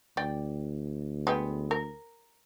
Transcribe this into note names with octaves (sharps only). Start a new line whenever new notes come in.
D2 D5 G5
G#3 B3 G5
A#4